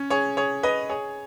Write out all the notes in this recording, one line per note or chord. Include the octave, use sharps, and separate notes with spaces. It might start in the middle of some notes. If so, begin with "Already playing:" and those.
Already playing: C#4
G#4 C#5
G#4 C#5
B4 D#5
G#4 C#5